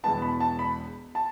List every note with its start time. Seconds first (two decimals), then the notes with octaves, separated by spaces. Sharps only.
0.04 E1 E2 B2 G#3 B3 A5
0.22 B5
0.40 A5
0.59 B5
1.15 A5